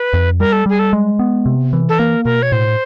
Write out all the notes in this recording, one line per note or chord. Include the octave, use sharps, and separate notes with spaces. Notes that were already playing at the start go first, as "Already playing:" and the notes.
Already playing: B4
F2
G3 A#4
A4
G3 G#4
A4
G#3
B3
C3
E3
A4
A#3 A#4
B2 A#4
C#5
A2 C5